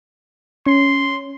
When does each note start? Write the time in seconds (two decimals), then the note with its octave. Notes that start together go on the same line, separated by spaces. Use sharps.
0.66 C#4 C6